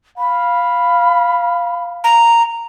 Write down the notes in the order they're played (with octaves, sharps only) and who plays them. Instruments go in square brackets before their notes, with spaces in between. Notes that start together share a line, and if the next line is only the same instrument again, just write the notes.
[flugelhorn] F5 [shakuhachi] B5
[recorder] A#5